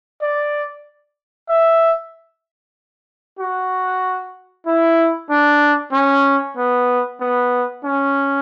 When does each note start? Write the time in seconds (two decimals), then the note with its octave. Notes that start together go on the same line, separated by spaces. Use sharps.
0.22 D5
1.49 E5
3.39 F#4
4.66 E4
5.30 D4
5.93 C#4
6.57 B3
7.21 B3
7.84 C#4